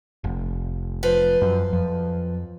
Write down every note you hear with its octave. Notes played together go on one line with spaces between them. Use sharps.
F1
F3 B4 C5
F#2
F2